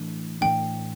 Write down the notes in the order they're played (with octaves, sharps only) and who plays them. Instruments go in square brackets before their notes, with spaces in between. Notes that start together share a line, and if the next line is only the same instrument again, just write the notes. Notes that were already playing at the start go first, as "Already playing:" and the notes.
Already playing: [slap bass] A2 E3 A3 D4
[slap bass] A2 E3 A3 D4 [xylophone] G5